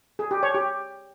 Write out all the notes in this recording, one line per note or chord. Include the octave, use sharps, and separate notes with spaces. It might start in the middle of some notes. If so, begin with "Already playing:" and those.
G#4
G4
C#5
G4